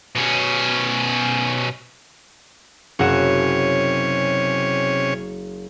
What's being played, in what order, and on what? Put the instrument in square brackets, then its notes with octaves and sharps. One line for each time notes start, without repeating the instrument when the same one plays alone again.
[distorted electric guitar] B2 C#4
[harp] F#1 F#4 E7 [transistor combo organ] C3 C#4 C#5